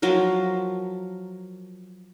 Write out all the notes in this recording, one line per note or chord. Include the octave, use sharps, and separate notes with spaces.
F3 F#3 F4 A#4